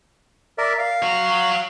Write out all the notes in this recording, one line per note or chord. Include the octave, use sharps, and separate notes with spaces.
A#4 D5 E5
F5
F#4 C#5